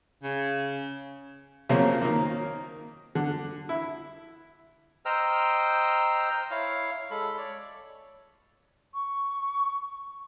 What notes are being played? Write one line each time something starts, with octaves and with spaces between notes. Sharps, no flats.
C#3
C#3 F3 F#3 A#3 C4 C#4
D#3 A#3
D3
E4
C5 D#5 G5 A#5 E6 F6
E4 C#5 F5
G#3 A4 B5
C#5 D5
C#6